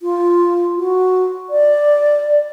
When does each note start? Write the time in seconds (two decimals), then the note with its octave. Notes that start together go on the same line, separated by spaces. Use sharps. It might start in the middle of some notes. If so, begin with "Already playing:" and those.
0.01 F4
0.77 F#4
1.50 D5